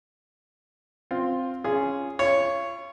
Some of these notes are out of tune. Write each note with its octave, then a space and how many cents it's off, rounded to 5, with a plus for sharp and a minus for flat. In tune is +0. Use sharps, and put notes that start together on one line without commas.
C4 +0 F4 +10
C#4 -5 F4 -15 G#4 +0
F4 -40 C#5 +0